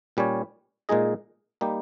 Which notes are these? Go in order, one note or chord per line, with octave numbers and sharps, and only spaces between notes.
A#2 G3 C#4 G4 C#5
A#2 G#3 D#4 G#4 D#5
G3 A#3 D#4 G4